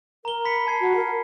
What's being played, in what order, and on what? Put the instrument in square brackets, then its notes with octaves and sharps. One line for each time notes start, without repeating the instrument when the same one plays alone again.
[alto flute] A#4 [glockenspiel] A#5 G7
[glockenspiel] B5 B6 C#7
A5 G#6 C7
[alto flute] F#4
A#4